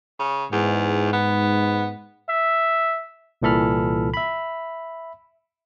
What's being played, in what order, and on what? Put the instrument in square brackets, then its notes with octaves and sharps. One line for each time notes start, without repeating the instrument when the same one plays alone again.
[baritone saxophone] C#3
[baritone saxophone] E2 [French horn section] G#2
[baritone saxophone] B3
[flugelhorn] E5
[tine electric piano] C2 A#2 E3 A4 B5 F6
E5 B5